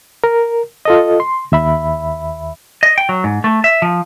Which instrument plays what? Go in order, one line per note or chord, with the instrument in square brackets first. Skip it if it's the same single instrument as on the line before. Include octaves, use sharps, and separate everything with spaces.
[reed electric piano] A#4
F4 A4 D#5
C6
D#2 E5 B5
[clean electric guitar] D#5
G5
F#3
G#2
A3
E5
F3